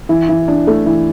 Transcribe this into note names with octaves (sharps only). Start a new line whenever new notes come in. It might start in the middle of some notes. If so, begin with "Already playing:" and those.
E3
E3
D4
A3
E3